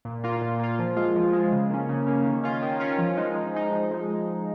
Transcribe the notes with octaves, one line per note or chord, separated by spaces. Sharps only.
A#2
A#3 F4
A#2
A#3 F4
F3
G#3 F4
F3
G#3 F4
C#3
A#3 C#4
C#3
A#3 C#4
D#3
C#4 F4
D#3
C#4 F4
F3
G#3 D#4
F3
G#3 D#4
F3
G#3 D#4